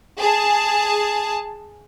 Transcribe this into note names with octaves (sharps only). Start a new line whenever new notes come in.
G#4 A5